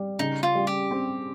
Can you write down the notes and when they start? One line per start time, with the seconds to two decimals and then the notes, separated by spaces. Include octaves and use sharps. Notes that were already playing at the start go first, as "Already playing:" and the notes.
Already playing: G3
0.19 C#3 D#4
0.43 F4
0.55 G3
0.67 G4
0.91 C4